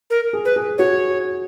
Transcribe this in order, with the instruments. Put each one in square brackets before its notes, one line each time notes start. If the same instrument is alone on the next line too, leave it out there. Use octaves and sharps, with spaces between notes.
[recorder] A#4
[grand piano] G#4
[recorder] B4
[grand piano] G#4
[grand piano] F#4 [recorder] C#5